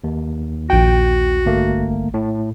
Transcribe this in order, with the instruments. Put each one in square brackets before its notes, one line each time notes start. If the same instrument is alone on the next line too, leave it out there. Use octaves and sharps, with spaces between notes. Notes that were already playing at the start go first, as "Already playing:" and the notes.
[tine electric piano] D#2
[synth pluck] A#1 G5 [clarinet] F#4
[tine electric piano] G1 A3 A#3
A2